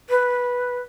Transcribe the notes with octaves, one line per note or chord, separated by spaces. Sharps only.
B4